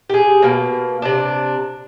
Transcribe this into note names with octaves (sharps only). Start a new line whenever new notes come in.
G4 G#4
B2 A#3
C3 D4